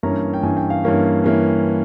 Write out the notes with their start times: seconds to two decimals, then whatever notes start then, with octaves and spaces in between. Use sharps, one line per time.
0.03 G2 E3 A#3 C#4 A#5
0.34 G5
0.43 G2 E3 A#3 C#4 G#5
0.57 G5
0.70 F5
0.84 G2 E3 A#3 C#4
1.24 E3 A#3 C#4